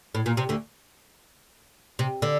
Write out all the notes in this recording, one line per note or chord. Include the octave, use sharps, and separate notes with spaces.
A2
A#2
C3
D2 D3
C3
D3